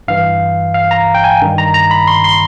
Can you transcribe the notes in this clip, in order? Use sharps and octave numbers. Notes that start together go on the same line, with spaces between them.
G2 E3 F5
F5
A#5
G5
G#5
G2 D#3
A#5
A#5
B5
C6
C6